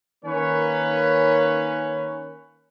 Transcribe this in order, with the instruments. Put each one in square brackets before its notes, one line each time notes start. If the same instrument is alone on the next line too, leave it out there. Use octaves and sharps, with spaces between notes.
[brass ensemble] D#3 A#3 C#4 B4 C#5